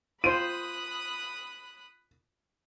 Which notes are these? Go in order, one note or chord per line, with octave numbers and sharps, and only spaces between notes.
F4 C5 B5 D#6 F#6 D#7